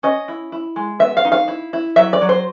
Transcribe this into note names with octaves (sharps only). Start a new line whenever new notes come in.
C#4 D#5
E4
E4
G#3
B3 E5
F5
D#4
F5
E4
E4
F#3 E5
D5
F#3
C5